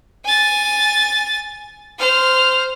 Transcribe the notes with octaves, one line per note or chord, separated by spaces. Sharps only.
G#5 A6
C5 F6